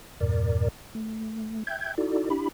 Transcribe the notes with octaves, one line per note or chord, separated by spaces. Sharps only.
E2 G2 A#2 A#4 D5
A3
E5 G5 G6 G#6
D#4 E4 F#4 A4 D5
D4 E4 G4 B5